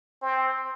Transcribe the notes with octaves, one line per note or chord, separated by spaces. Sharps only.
C4